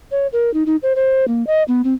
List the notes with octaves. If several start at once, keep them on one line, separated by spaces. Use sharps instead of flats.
C#5
A#4
D#4
D#4
C5
C5
A#3
D#5
B3
C4